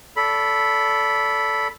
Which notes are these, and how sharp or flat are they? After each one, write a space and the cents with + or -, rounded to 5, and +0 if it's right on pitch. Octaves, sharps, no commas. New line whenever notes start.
A4 +0 D5 -25 B5 +0